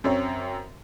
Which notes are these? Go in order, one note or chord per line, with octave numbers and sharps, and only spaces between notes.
F#2 C4 C#5